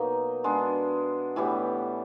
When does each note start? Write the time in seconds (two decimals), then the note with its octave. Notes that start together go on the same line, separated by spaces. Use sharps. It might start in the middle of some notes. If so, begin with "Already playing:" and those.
Already playing: B2 F#3 A#3 D#4
0.44 G#3 B3 D4
1.36 A2 E3 G3 B3